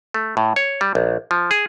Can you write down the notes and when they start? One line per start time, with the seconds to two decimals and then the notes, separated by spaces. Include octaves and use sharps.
0.14 A3
0.37 A2
0.56 C#5
0.81 G3
0.95 A#1
1.31 F3
1.51 G#4